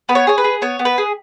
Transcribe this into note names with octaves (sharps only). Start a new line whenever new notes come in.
B3 B4
C#5
G#4 C#5
B4
G#4
B3 C#5
B3
B4
G#4